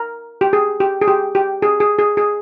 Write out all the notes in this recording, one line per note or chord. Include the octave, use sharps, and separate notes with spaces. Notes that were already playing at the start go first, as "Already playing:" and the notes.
Already playing: A#4
G4
G#4
G4
G#4
G4
G4
G#4
G#4
G#4
G#4